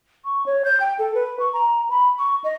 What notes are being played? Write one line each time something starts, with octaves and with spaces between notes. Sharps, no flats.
C#6
C#5
G6
G5
A4
B4
C#6
A#5
B5
C#6
D#5